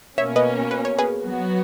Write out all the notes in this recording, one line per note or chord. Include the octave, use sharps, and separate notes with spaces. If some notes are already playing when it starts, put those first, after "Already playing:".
B2 A#3 C#4 C#5 E5
B4 D#5
B4
C#5
G#4 B4
F#3 B3 F#4